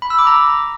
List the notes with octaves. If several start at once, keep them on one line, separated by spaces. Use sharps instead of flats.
B5
E6
D6
A#5